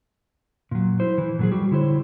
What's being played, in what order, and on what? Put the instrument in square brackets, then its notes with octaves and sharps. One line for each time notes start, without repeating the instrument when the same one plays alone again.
[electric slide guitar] A#2 F#3
E4 C5
E3
A#2 F#3 G#4
G3 F#4
D3 E4 G#4 C5 C#5